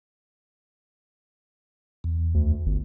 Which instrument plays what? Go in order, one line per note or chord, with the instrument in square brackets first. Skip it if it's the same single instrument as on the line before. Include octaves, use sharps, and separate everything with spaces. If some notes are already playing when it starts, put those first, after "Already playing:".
[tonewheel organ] E2
[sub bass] D2
G1